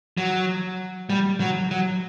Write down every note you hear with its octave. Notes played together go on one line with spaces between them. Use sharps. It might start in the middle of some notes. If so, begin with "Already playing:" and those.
F#3
G3
F#3
F#3